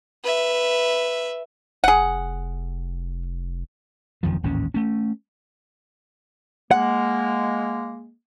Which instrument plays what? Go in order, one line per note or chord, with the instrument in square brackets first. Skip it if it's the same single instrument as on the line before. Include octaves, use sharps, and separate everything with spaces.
[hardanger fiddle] B4 E5
[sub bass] F1 [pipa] G#4 F#5
[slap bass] F#1 F2 D#3 F3
A1 D#2 G#2 C#4
A3 C#4
[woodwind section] G#3 A#3 [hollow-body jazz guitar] F#5